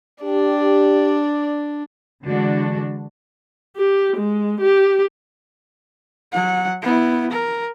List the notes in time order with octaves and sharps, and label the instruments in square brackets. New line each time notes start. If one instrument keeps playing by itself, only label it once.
[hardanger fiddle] D4 [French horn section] G4 [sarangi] D5
[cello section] D3 E3 G#3 D4 F#4
[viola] G4
G#3
G4
[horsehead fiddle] F#3 F#5
B3 E4
A#4